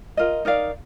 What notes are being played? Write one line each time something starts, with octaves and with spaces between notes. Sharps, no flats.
F4 A#4 D#5
D#4 A#4 D5 F5